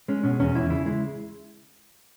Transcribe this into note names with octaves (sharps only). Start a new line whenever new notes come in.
G#3 C#4
B2 C#4
E2 C#4
E2 E4
C#3 E4
G#3 E4